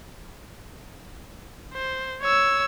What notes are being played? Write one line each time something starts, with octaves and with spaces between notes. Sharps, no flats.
C5
C#5 E6